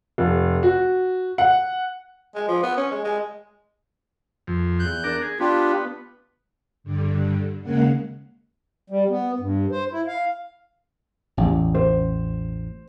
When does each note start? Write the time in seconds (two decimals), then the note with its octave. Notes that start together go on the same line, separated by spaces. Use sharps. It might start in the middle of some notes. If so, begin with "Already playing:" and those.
0.18 F1
0.63 F#4
1.38 F#5
2.35 G#3
2.48 F3
2.63 B3
2.77 C#4
2.91 G#3
3.04 G#3
4.47 F2
4.79 E2 F#6 G6
5.04 D4 A#4
5.22 G#4
5.40 B3 D4 F4 G4
6.84 G2 D3
7.63 D#2 C#3 G#3 A#3 F#5
8.90 G3
9.10 B3
9.40 G2
9.72 C5
9.91 E4
10.07 F5
11.37 A1 E2
11.75 C5